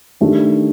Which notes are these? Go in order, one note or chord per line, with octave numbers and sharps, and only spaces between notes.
D#3 A3 D4 G4